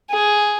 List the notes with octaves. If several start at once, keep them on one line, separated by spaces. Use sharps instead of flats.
G#4